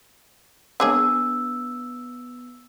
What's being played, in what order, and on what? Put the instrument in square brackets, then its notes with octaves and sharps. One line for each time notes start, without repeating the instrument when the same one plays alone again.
[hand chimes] B3 E6 [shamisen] D4 G#4 C#5